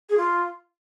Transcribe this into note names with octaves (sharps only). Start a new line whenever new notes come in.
G#4
F4